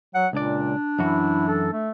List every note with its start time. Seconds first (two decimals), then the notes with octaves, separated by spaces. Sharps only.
0.15 F#3 F#5
0.33 C#2 A#2 D4 D5
0.99 F#2 E3 E4 F#4
1.48 A4
1.73 A3